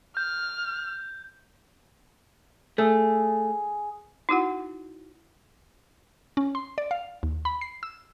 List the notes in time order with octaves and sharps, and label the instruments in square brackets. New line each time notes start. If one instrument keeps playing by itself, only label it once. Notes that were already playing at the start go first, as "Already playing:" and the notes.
[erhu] F6 [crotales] G6
[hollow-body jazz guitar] A3 [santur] G#4
[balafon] D#4 E4 F#4 F#5
[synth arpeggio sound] C#4
C6
D5
F5
D#2
B5
C7
E6